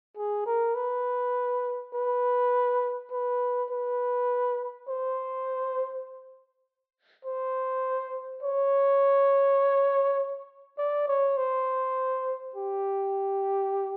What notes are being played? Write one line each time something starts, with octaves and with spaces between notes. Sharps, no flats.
G#4
A#4
B4
B4
B4
B4
C5
C5
C#5
D5
C#5
C5
G4